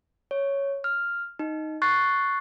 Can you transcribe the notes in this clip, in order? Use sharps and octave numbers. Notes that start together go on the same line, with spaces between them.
C#5
F6
D#4
C#6 F#6 A6 C7